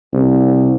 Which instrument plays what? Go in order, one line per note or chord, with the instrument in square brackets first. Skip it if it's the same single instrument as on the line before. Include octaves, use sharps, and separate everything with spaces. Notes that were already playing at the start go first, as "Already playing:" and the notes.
[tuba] C2